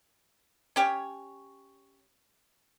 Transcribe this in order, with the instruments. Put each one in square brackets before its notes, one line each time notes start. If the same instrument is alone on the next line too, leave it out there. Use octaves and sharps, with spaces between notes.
[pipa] C#4 G4 C#5